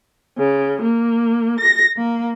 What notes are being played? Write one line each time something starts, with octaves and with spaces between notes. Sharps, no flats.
C#3
A#3
A#6
A#3